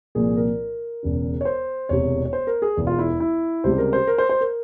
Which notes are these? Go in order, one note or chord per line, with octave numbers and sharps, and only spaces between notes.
C2 A#2 F3 A#3 G#4
A#4
E1 E2 C#3
C#5
C5
E1 E2 C3 C#5
C#5
C5
A#4
G#4
E1 E2 E3
F4
E4
E4
C#2 C3 G3 C5
A#4
C5
A#4
C5
C5
A#4